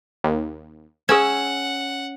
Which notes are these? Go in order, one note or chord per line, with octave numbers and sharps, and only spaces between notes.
D#2
C#4 G#4 C#5 F#5 E6 G#6